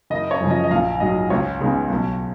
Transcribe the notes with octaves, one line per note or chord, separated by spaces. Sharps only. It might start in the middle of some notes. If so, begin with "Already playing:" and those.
F#1 D#5
C#5
F#2 C#3 F3
D#5
D#5
A#1 F5
G#2 F#3 D#5
C#2 C#5
C#3 G#3 B3 D#4
B1